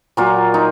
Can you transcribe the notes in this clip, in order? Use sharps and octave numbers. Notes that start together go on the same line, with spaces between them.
A#2 F#3 A#3 F4
D#4